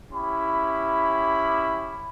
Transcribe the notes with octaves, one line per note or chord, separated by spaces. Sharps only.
C#4 E4 G4 B5